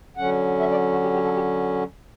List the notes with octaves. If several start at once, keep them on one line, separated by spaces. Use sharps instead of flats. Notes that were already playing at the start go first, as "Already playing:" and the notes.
D3 F#3 C#4 F#5
E5
D5
F#4
G4
G4
A4
G4